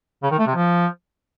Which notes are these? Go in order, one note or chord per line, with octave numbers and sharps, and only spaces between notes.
C#3
D#3
A3
C3
F3